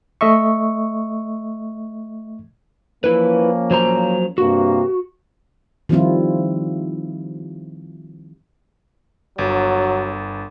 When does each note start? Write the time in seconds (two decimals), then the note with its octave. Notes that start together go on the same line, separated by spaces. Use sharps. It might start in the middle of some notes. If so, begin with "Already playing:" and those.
0.21 A3 D#5 E5 C#6
3.04 F3 A#3 C#4 E4 B4
3.71 F#3 C5 A#5
4.38 G2 C3 A#3 F#4
5.89 D#3 F3 G3 C4 E4 F4
9.38 G1 F#3